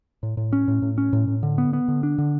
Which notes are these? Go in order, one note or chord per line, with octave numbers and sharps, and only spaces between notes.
A2
A2
C#4
A2
A2
C#4
A2
A2
D3
B3
B3
D3
D4
D3